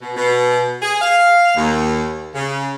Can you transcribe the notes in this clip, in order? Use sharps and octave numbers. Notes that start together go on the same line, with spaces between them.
B2
B2
G#4
F5
D#2
C#3